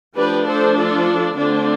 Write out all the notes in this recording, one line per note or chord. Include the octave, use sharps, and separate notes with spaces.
F3 A3 D4 G4 B4
A4 C5
F4 A4
D3 A3 C4 D4 F4